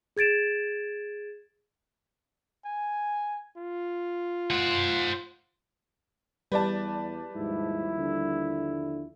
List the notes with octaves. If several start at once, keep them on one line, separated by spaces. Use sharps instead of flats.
G#4 G#6 A6 D7 E7
G#5
F4
C5 F#5
E2 G3 B4 D5 A5
D#2 G#2 F3 E4
D3